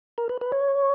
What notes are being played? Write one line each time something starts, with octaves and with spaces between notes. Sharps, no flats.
A#4
B4
B4
C#5